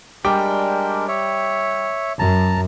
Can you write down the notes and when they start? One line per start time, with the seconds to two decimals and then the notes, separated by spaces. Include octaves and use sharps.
0.24 G3 G#3 D4 A#4 G5 D6
1.08 C#5 E5
2.19 F#2 A5 A#5